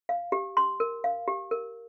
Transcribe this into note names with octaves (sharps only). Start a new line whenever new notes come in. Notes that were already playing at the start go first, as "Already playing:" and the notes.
F5
G4
C6
A#4
F5
G4
A#4